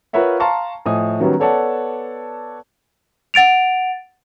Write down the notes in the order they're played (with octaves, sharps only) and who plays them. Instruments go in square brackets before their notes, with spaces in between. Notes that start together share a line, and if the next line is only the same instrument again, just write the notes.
[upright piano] F4 A#4 B4 C#5 E5 F#5
F5 A5 A#5 C6 C#6
A2 F3 D#5 G#5 D#6
D#3 F#3 G3 B3 C#4
B3 A4 C#5 D5 F#5 A5
[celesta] F#5 A6 D7 F7